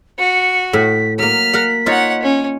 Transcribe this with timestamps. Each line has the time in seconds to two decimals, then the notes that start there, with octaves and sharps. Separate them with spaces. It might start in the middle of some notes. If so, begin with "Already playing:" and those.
0.19 F#4 C#7
0.73 A2 B6
1.19 F#3 A#3 F6 B6
1.53 A#4 F5 F#5
1.86 D#4 F4 C#5 F#5
2.22 C#4